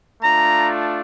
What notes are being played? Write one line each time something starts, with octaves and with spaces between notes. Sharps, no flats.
A3 D4 F4 A#5